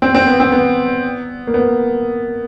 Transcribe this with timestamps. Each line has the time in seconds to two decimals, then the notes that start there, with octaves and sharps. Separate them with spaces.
0.02 C4
0.15 C4
0.27 B3
0.40 C4
0.52 B3
1.47 A#3
1.54 B3